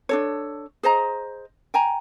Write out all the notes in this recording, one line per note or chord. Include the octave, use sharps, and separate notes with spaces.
D4 A4 C#5
G#4 C5 D#5 A#5
G5 G#5 A#5